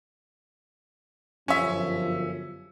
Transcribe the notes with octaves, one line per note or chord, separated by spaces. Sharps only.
G1 F#2 F3 C#4 E5